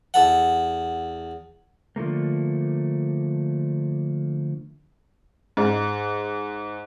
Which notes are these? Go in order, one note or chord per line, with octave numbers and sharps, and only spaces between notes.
E2 A4 F#5
D3 F3 A3 A#3
G#2